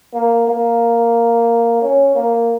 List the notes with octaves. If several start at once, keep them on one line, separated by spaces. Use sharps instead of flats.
A#3
A#3
C#4
A#3